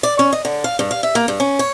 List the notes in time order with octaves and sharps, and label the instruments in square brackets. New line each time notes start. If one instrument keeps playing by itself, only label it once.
[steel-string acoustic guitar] D5
C#4
D#5
D3
F5
G2
F5
E5
A#3
G2
C#4
C#5